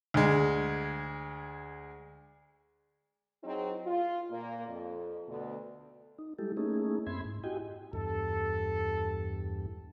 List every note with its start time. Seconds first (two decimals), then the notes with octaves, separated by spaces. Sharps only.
0.14 D2 G#3
3.44 F#3 C4 D#4 E4 G#4
3.86 F4
4.30 A#2 A#3
4.69 F2
5.29 D2 B2
6.18 D#4
6.38 G3 G#3 E4 G4 A4
6.57 A3 A#3 C#4 D#4 E4 G#4
7.07 F#2 C4 E5 B5 C6 G#6
7.25 G#2
7.44 E4 F#4 G4 D#5 G5 G#5
7.93 E2 G2 A4